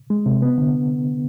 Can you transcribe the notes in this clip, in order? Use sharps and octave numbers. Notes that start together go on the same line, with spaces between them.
G#3
C3
B3
D3